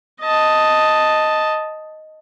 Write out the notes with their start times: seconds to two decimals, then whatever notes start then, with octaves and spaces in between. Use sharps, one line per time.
0.21 D#5 A5